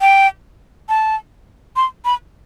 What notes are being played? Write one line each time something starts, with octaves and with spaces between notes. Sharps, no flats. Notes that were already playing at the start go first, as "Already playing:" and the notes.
G5
A5
C6
B5